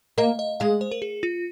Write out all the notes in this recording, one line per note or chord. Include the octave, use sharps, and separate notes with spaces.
A#3 D#5
D#5
G#3 F5
C5
A#4
G#4
F4